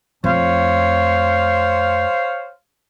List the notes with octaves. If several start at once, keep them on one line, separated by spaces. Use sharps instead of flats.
F2 A3 C5 C#5 F5